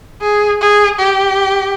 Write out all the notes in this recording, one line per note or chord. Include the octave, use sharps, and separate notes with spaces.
G#4
G#4
G4